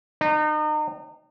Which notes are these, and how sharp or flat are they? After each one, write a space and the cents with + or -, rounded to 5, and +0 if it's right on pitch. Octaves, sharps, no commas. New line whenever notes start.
D#4 -35